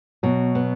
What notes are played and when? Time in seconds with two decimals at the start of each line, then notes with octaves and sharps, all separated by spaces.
0.23 B2 F#3
0.55 B3